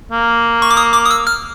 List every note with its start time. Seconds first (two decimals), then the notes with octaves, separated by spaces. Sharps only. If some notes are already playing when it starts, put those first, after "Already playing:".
0.11 A#3
0.62 C#6
0.71 D6
0.77 D#6
0.94 D6
1.05 D#6
1.11 E6
1.27 F6